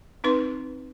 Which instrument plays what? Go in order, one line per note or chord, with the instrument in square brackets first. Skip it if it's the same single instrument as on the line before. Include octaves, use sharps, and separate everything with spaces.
[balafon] C4 D#4 B4 C6